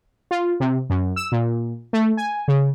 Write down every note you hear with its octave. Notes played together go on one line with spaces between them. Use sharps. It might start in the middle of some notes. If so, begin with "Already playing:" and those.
F4
C3
F#2
E6
A#2
A3
G#5
C#3